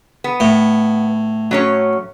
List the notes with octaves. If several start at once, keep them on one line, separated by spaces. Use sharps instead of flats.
B3
A2
F#3 C#4 C#5